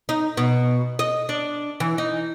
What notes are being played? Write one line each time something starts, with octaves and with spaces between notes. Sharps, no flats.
D#4
B2
D#5
D4
E3
D#4